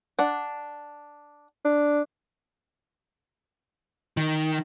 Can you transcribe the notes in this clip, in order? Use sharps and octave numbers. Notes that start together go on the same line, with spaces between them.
D4 F#5
D4
D#3